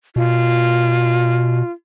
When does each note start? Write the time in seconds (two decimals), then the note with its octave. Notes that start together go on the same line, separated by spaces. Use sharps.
0.16 B2 F4